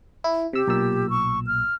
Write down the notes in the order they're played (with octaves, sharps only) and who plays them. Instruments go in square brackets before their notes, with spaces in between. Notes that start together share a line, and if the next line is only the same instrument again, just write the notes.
[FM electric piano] E4
[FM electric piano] C3 E6 [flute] G4
[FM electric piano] B1 A#2 E6
[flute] C#6
F6